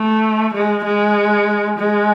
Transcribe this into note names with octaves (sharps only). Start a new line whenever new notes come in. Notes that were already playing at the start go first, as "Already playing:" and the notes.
Already playing: A3
G#3
G#3
G#3